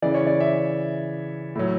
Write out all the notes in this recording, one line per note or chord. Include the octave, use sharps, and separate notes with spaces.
C#3 E3 D5
C#5
D5
E5
A2 F#3